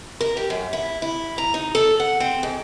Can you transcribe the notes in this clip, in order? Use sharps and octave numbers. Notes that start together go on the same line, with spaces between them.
A#4
G4
F#2
E4
E4
A#5
D#4
A4
F#5
C4
G#2